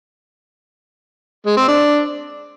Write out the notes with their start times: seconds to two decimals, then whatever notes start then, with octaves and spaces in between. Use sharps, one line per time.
1.46 G#3
1.57 C4
1.68 D4